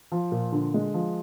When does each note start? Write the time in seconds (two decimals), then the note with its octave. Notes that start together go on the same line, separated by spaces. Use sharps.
0.12 F3
0.32 A#2
0.52 D3
0.74 G#3
0.94 F3